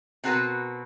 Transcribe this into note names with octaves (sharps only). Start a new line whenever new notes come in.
B2 C4 F#4 G#4 A#4 B4